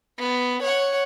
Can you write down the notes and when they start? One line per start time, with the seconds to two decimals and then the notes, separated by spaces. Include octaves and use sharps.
0.19 B3
0.63 C#5 F#5